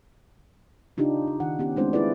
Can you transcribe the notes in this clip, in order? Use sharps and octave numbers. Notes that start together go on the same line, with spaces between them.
C#3 D4 D#4 F4 G4
D4
D#3 F#5
B3 C#4 G4
G#3 A3 C4 D4 E4 C5
C#4 E4 F4 G#4 B4 D5